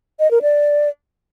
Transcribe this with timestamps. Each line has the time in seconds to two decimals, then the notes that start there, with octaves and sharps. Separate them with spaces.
0.20 D#5
0.31 A#4
0.42 D5